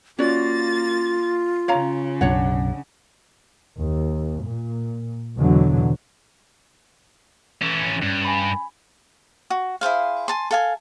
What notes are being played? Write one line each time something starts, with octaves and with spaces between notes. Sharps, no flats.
A#3 C#4 F4 F#4 D5 A6
C#3 C#5 F5 A#5
B1 F#2 D4 C#5 F#5
D#2
A#2
E2 B2 D3 E3 F#3
E3 C#4
G2 C#4
G#5 B5
F#4
E4 G#4 C5 F5
G#5 A5 C6
A4 F5 G#5